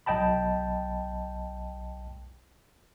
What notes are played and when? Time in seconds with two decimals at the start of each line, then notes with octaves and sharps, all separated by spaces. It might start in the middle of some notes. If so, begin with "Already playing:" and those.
0.06 B1 D#5 G5 A5 B5